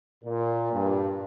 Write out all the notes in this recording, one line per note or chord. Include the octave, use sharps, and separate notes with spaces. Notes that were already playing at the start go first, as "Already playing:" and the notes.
A#2
G2